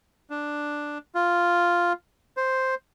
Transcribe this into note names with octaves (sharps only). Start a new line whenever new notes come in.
D4
F4
C5